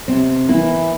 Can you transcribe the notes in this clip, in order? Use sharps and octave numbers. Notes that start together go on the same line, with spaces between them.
C3 C4
E3 A#3 E4